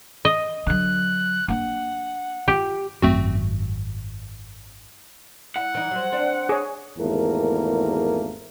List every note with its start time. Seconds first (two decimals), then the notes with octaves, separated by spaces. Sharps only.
0.25 D#5
0.67 D3 F#3 F#6
1.48 A#3 D4 F#5
2.48 F4 G4
3.02 G#1 F#2 F#3 A3 C4 F#4
5.56 E4 F#5
5.75 E3 D#4
5.91 F#3 C5
6.12 C4 D4
6.49 G#4 C#5
6.97 G#1 E2 A3 A#3 A#4